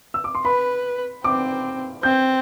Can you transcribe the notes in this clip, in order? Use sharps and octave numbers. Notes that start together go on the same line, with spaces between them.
E6
D6
C6
B4 B5
C4 D6
C4 G6